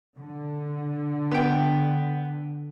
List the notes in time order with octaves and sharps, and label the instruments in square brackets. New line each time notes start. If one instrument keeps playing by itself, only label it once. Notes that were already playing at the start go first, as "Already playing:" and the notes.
[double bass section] D3
[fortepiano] B3 G5